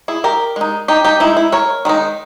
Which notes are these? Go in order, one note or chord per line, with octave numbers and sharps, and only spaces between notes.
E4 G#4
G4 A#4
G#3 D#4
D#4 G4
D#4 G4
G#3 D#4 E4
E4
A#4 C#5
D#3 G#3 D#4